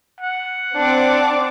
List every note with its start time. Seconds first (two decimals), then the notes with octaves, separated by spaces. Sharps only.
0.20 F#5
0.76 C4 D4 D6